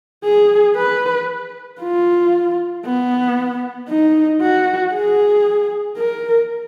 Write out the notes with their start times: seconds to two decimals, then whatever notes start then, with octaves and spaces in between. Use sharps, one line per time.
0.24 G#4
0.76 B4
1.81 F4
2.85 B3
3.89 D#4
4.41 F#4
4.93 G#4
5.97 A#4